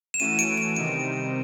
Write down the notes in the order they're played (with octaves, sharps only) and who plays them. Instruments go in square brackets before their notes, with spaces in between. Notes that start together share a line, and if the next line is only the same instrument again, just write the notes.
[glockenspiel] E7
[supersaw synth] E3 A3 C#4 F#4 [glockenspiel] D#7
[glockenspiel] D7
D7
[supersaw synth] C3 D#3 G3 C4 D#4 [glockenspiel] D7